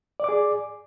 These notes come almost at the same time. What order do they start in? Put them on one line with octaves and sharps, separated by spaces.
D5 D6 G#4